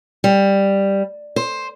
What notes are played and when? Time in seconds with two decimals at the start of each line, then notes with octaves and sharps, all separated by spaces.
0.24 G3
1.36 C5